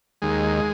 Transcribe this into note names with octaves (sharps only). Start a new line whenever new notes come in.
D#2 G#3